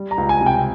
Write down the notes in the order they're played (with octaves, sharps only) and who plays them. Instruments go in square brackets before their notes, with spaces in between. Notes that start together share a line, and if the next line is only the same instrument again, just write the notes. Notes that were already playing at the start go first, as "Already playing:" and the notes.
Already playing: [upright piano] G3
[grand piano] A#5
[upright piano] C#2
[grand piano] G#5
[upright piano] C3
[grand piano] G5